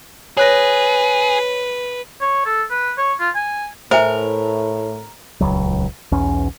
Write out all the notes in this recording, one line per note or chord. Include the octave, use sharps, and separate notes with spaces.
G#4 B4 C#5 F#6 A#6
C#5
A4
B4
C#5
F4
G#5
A2 A#4 C5 E5 G#5
D#1 C#2 F#3
B1 E2 C#4